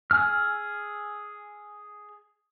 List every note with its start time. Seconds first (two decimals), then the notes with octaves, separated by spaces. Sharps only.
0.11 G#4 G#5 E6 F6